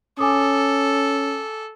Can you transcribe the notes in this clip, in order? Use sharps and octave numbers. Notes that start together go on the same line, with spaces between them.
C#4 A4 G#5 D6 D#6